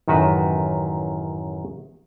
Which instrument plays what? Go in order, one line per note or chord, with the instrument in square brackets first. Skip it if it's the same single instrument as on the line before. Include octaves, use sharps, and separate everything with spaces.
[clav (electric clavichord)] A1 F#2 D#3 F#4 B4